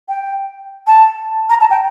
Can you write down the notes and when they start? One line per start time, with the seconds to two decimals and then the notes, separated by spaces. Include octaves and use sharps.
0.08 G5
0.86 A5
1.49 A#5
1.60 A5
1.70 G5